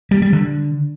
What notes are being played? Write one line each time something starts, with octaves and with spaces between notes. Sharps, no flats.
G3
G3
D3